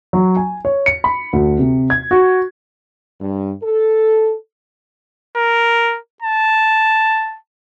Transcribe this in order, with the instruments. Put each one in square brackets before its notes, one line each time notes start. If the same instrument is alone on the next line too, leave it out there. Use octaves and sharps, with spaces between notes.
[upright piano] F#3
G#5
C#5
C#7
B5
D2
C3
G#6
F#4
[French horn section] G2
A4
[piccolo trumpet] A#4
A5